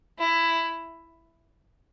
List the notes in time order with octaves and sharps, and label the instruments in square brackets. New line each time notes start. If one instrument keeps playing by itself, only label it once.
[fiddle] E4